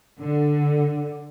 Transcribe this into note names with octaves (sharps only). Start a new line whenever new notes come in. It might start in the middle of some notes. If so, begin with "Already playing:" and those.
D3